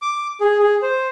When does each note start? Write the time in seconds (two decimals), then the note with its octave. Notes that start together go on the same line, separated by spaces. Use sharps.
0.02 D6
0.41 G#4
0.60 G#4
0.82 C5